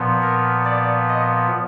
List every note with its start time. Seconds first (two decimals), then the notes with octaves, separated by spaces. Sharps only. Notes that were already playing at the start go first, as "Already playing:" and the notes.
Already playing: A#2 F3 B3
0.22 A#4
0.65 D5
1.09 D#5